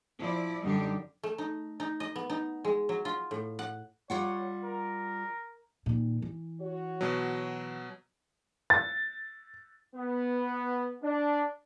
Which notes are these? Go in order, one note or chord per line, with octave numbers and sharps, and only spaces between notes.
F3 E4 D5
F#2 D3 G3 D4 D#4 G4
A3
D#4
D#4
D#5
B3
D#4
G#3
F#3
F4
A2
F#5
G3 F4 C#5 F#5
A#4
A#2 D#3
E3
F#4 C#5
B2 F#3
A6
B3
D4